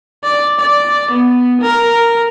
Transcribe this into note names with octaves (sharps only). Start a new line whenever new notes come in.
D5
D5
B3
A#4